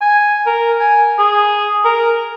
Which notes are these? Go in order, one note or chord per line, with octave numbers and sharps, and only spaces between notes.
G#5
A#4
G#5
G#4
A#4